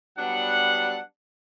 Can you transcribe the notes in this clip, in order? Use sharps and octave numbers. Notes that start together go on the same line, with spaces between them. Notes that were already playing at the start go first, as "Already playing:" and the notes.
F#3 G3 B3 D4 F#5